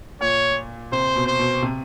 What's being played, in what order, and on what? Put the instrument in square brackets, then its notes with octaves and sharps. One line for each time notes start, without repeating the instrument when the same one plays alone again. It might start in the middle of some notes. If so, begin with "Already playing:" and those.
[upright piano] A#2 [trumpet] C#5
[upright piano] C3 [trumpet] C5
[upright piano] B2
[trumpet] C5
[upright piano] B2
C3